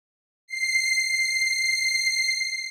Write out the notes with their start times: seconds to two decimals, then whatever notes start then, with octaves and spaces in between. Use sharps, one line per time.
0.48 C7
1.02 C7